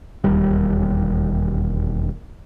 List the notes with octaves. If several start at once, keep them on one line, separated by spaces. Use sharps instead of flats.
E1 D#2 G3